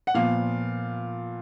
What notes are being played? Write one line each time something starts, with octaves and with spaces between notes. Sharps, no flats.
F#5
A#2 F3 B3 F5